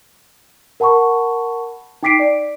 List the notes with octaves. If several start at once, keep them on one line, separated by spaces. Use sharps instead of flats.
A#4 F#5 A5 B5 C#6
D#4 G5 D6 B6 C7 D7
D5